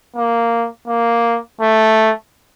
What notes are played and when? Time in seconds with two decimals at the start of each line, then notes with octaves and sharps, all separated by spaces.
0.16 A#3
0.88 A#3
1.61 A3